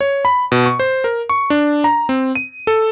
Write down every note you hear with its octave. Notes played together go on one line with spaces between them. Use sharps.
C#5
B5
B2
C#6
C5
A#4
C#6
D4
A#5
C4
D#7
A4